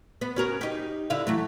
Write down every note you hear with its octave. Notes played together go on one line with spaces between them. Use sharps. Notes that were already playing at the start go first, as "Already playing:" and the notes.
B3
C#4 F#4 A#4
D#4 G4
D3 E4 F5
E3 F#3 A3